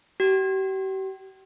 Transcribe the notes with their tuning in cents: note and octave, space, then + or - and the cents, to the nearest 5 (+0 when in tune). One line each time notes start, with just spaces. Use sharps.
G4 -40